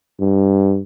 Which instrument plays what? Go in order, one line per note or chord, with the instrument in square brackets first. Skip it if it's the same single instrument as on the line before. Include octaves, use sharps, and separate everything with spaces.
[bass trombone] G2